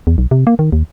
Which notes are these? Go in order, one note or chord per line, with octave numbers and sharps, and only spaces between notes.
E2
B1
C3
A#3
D#3
D#2